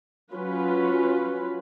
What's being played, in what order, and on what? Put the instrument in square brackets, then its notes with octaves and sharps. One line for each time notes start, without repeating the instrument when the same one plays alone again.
[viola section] F#3 C#4 F4 B4